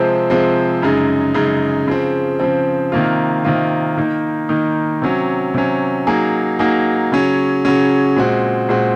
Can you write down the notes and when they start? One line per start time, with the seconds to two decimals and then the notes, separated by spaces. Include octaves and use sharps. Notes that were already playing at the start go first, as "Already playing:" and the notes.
Already playing: C3 F3 G#3 C4
0.30 C3 F3 G#3 C4
0.82 F#2 C#3 G#3 D#4
1.34 F#2 C#3 G#3 D#4
1.88 C#3 F3 C4
2.40 C#3 F3 C4
2.92 C3 D#3 A#3 F4
3.44 C3 D#3 A#3 F4
3.97 D#3 A#3 D#4
4.49 D#3 A#3 D#4
5.02 C3 F#3 C#4
5.54 C3 F#3 C#4
6.07 F#3 A#3 D#4 G#4
6.59 F#3 A#3 D#4 G#4
7.12 C#3 F#3 C#4
7.65 C#3 F#3 C#4
8.16 A#2 G#3 C4 F#4
8.69 A#2 G#3 C4 F#4